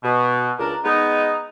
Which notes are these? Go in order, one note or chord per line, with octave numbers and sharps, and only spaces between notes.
B2
C#2 D4 A#4
G#3 B3 D#4